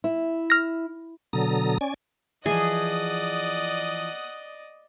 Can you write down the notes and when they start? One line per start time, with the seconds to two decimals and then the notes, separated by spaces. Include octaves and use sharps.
0.04 E4
0.50 F6 A#6
1.33 B2 D3 F#3 A4 A#5 D#6
1.81 C#4 D5 G#5
2.46 E3 F3 G#4 D5 D#5 F#5 G#5 D#6